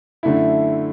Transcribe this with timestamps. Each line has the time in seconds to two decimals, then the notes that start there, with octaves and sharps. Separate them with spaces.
0.23 F#2 D3 A3 E4